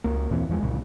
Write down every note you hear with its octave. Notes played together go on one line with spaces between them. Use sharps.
C#2 A#3
D#2 A#2 E3 C4
E2 F3 G#3
C2 A#2 C#3